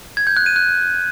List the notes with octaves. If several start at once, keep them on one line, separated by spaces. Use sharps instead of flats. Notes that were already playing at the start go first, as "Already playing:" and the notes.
G#6
G6
F#6
D#7
F#6